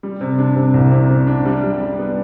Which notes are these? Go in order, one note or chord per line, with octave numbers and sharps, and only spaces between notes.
G3
C3
D4
C3
C2
C3
C3
D4
G3
G3
G3
B3